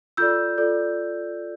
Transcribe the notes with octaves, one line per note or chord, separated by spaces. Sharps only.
F4 A4 D5 E6 G6
F4 A4 D5